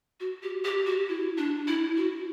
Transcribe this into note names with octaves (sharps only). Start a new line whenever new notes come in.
F#4
G4
G4
F#4
E4
D4
E4
F#4